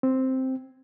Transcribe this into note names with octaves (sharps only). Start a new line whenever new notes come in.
C4